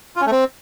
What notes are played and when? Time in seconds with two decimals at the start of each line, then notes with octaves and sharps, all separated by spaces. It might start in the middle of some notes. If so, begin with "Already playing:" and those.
0.16 F4
0.21 C#4
0.26 A3
0.32 C4